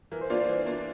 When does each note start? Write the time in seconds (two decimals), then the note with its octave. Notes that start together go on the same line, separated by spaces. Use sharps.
0.12 E3 A#4
0.21 C5
0.30 A#3 D4 F4 D5
0.39 C5
0.49 E3
0.66 A#3 D4 F4